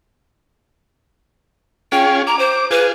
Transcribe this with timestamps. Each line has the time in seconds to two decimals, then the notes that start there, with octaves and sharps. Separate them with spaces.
1.92 C#4 F4 G#4 G5
2.27 A#5 D6
2.39 C5
2.71 F4 G#4 B4